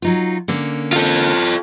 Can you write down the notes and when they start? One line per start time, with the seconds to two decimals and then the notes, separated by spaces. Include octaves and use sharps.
0.02 F#3 D#4 F4
0.48 D3 A#3 C#4
0.93 F4 A4